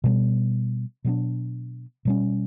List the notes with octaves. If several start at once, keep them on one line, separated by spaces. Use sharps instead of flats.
B2 G3 B3
B2 F#3 B3 D4
B2 G3 C#4